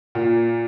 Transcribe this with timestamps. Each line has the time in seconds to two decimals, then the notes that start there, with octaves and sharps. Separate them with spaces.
0.15 A#2